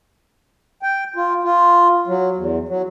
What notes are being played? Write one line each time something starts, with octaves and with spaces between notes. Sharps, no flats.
G5
F4
F4
F#3
E2
F#3